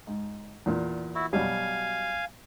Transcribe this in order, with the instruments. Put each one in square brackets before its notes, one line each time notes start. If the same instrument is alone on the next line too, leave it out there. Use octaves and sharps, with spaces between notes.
[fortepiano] G#2
E2 A#2
[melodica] E4 F#4
[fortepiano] B2 F#3 G3 [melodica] F5 G#5